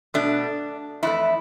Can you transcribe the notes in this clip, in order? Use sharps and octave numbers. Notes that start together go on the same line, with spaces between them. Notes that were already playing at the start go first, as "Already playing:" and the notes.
B2 A3 D4
F2 E3 A3 E4